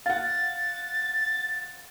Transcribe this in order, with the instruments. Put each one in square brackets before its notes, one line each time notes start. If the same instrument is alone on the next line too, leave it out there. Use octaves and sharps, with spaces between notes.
[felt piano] F5 F#5 [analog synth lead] A6